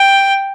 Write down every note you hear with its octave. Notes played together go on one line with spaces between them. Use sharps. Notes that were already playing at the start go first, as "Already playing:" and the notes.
Already playing: G5